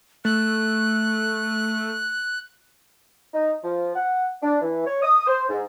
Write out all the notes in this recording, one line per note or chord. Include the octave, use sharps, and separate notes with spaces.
A3 F#6
D#4
F3
F#5
D4
E3
C#5
D#6
C5
G#2